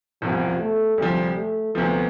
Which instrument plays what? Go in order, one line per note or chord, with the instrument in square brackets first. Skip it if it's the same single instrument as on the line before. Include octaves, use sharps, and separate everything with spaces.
[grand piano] E1 E2 C3 G3 [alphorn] F3
[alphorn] A3
[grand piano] D2 C3 F3 [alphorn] G3
[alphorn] A3
[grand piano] D2 C3 F3 [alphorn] B3